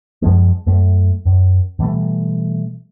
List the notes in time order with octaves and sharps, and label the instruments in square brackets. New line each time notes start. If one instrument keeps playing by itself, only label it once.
[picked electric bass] F#2 F3 G#3
F#2 A3
F#2
B2 E3 G3 A3